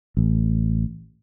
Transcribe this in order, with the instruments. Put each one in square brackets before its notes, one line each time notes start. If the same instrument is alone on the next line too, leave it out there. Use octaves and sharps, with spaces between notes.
[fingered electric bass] A1